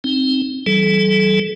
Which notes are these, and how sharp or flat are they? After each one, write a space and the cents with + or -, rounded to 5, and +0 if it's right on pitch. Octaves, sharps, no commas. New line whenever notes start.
C4 +10 D#4 +0
E3 +0 G3 -35 A4 -35